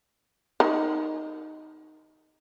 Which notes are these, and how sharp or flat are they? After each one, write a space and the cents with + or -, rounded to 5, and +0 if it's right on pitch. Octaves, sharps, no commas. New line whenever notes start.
D#3 +0 A#4 +0